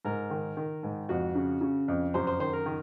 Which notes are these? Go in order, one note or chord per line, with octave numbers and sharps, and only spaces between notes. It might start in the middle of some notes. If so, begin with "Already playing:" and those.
G#2 A#4
D#3
D#3
G#2
F2 F#4
C#3
C#3
F2
F#2 C5
C5
D#3 C5
A#4
D#3